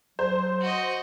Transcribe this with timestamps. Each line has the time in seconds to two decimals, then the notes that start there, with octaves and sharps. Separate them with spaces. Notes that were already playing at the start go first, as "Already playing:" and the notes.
0.19 F#3 C5
0.61 F#4 D#5